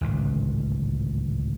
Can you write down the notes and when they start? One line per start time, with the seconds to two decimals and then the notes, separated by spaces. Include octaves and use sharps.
0.01 D1 G#1 C#2